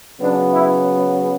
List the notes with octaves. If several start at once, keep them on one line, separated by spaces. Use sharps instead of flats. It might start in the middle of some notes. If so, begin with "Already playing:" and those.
C#3 F#3 B3 D4
E4